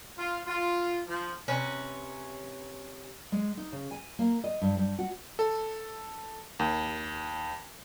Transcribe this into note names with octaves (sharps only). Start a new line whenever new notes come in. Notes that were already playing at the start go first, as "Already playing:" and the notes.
F4
F4
F3
C3 C#4 B4
G#3
D#4
C#3
G#5
A#3
D#5
G2
G2
F#4
A4
D#2